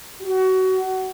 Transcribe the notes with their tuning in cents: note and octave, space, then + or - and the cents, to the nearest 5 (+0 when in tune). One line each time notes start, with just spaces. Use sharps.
F#4 +25